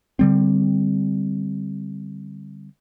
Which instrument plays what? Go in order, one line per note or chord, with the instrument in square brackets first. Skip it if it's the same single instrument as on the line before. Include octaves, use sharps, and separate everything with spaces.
[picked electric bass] D3 G3 C4